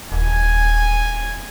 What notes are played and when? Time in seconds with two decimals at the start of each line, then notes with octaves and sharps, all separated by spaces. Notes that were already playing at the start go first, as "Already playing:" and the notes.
0.12 D#1 G#5